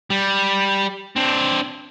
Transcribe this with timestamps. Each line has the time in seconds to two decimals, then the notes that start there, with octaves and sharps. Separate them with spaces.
0.10 G3
1.16 C4 D4